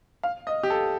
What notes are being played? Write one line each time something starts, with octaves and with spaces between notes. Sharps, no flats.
F5
D#5
G4
A4